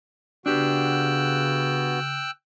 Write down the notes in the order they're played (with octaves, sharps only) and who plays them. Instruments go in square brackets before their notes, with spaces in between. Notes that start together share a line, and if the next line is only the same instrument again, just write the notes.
[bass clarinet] C#3 [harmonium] B3 F#4 [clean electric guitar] D4 G4 [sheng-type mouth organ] G5 E6 F#6